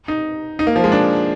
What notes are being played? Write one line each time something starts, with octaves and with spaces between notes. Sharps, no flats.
D#4
D#4
A#3
F3
G#3
D4